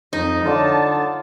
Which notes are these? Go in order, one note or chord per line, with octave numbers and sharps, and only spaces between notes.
F2 D#4
D3 F4 C#5 D5 A5